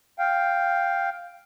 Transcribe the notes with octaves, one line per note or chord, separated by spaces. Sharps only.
F5 G5